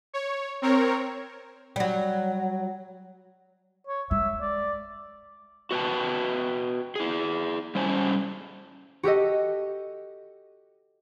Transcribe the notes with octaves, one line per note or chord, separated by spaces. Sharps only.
C#5
C4 A#4 C#5
F#3 G3
C#5
G#3 E5
D5
F#4 B4 G5 A5
E4 G#4
G3 C#4 C5 G#5 A5
F#4 G4 A4 D#5